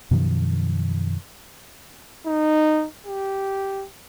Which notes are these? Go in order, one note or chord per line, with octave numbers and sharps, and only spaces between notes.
F#2 B2 D#3 F3
D#4
G4